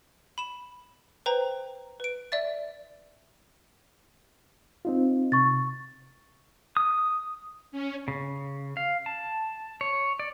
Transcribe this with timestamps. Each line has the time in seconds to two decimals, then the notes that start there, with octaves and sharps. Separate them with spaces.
0.38 B5 E7
1.26 B4 C5 G5 A#5
2.00 B4 D7
2.32 D5 E5 A6
4.85 C4 D#4 F4
5.32 C3 C#6 A6
6.77 D#6
7.72 C#4
8.08 C#3
8.77 F5
9.06 A5
9.81 C#5
10.19 D5